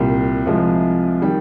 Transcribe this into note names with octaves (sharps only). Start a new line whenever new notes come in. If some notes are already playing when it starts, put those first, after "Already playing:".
Already playing: C2 A#2 G3
C2 C3 F3 G#3
D#3 G3 G5